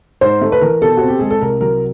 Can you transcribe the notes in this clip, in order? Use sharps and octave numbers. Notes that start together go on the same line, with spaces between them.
G#2 C5
A3
B4
E3 A#4
B2 A4
C4 F#4
G4
G#3 G#4
A4
C2 A#4
F#3 A#4